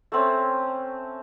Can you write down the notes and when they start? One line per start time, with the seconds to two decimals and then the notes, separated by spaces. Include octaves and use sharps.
0.12 A3 C4 C#4